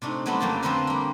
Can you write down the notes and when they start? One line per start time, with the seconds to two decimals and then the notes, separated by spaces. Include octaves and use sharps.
0.02 C3 A3 D4 D#4
0.26 F#3 G3 A3 B3 C4 D4
0.40 F2 C#3 A#3 G5 A5
0.62 D3 F3 C4 A#4 B4 F5
0.87 G3 A#3